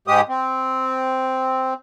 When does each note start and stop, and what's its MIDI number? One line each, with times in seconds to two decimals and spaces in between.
0.08 0.21 44
0.08 0.21 56
0.08 0.21 67
0.08 0.21 87
0.29 1.74 60